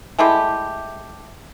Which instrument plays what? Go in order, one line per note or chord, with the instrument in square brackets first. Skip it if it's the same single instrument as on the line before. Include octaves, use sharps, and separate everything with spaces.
[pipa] G#3 A3 E4 G4